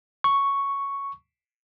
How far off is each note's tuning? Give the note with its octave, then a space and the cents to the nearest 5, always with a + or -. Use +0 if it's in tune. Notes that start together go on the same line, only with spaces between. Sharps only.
C#6 +0